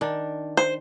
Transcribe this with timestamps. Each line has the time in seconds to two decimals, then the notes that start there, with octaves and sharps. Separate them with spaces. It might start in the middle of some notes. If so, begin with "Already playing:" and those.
0.01 D#3 D4
0.57 C5